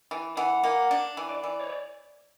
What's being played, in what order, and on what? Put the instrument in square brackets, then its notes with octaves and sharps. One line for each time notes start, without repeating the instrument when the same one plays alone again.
[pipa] E3
[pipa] E3 [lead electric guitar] F#5
[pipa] A#3 [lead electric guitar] F#5
[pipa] D4
E3
[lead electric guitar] D5
[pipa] E3
[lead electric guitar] C#5